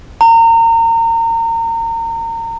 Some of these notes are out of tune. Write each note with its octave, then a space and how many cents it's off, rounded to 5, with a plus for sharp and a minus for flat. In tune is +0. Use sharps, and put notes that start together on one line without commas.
A#5 -30